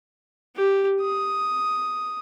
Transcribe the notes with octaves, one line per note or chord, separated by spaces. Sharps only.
G4
D#6